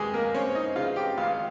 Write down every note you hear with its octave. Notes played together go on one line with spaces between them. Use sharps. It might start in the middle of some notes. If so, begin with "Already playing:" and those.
Already playing: D#2 G#3 G4 G#4
A#3 A#4
C4 C#4 C#5
D#4 D#5
C#3 F4 F5
G4 G5
G#1 F4 F5